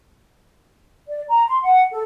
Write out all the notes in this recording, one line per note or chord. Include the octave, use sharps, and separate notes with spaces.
D5
A#5
C6
F#5
A4